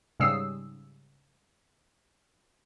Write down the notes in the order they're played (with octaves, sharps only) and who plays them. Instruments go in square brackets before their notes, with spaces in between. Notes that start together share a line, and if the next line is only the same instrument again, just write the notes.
[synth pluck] G#2 C#3 G3 D#6 E6 C7